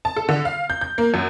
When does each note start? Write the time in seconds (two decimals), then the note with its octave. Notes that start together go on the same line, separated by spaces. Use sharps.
0.05 A5
0.16 A4
0.29 D3
0.45 F5
0.70 G6
0.81 G6
0.98 A#3
1.14 F#2